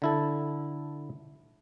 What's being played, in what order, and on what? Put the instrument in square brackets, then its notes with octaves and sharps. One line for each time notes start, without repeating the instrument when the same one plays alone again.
[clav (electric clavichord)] D3 E4 A4